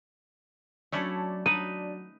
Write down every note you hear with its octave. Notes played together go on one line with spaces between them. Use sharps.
F#3 A3 C#4 D4 E4 D5 A5
F#3 D#4 B4 D#7